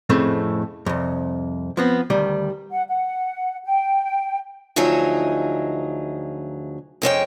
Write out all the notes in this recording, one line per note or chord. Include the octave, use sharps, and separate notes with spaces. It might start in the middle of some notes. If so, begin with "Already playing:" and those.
F2 A2 C#3 A3 C4
C2 F2
F3 B3 C4
D2 D#3 G3
F#5
F#5
G5
D2 F3 F#3 D#4 G#4 E5
F2 G#3 C#4 G5